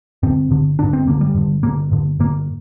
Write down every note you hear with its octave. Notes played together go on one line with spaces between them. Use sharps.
G2 D3 C4
G2 D3
G2 D3 D4
C4
G2 D3 A#3
G3
G2 D3
G2 D3 A#3
G2 D3
G2 D3 A#3